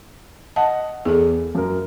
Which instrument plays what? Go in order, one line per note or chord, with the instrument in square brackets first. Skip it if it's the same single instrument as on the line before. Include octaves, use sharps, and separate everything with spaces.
[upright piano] D#5 F#5 [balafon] A5
[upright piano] E2 [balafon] G#4 A4
[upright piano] F#2 A#4